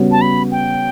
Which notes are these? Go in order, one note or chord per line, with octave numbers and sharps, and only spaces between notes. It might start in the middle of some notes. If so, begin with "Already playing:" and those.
Already playing: C#3 G3 B3 F#4 C#5
A5
B5
G5